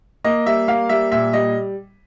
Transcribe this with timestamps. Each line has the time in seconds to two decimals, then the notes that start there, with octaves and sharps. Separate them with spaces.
0.24 A#3 D#5
0.46 G3 E5
0.68 A#3 F5
0.89 G3 E5
1.12 A#2 E5
1.33 G3 D#5